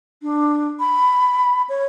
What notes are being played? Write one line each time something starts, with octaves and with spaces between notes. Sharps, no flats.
D4
B5
C#5